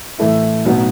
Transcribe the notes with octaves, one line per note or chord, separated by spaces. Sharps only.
A2 E3 A3 E4
B1 A2 F#3 B3 D#4